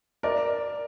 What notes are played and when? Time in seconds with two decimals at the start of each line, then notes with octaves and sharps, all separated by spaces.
0.23 A#4 D5